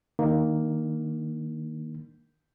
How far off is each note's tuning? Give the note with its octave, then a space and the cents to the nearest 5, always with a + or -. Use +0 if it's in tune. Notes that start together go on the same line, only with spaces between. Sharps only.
D#3 +0 A#3 +0 D4 +25